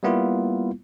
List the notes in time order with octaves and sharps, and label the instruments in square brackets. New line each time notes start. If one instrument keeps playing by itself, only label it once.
[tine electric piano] G3 A#3 B3 E4 F4